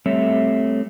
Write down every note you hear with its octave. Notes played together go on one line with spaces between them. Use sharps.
G3 A3 C4 C#5 E5